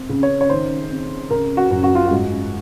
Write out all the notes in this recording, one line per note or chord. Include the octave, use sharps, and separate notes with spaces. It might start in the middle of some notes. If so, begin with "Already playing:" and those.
Already playing: C4
C#3
C#5
C#5
D#3 C5
C4
C#3 A#4
F#4
F#2
F#4
F4
G#2 F#4